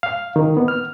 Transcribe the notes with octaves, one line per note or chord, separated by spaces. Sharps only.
F5
D#3
B3
F6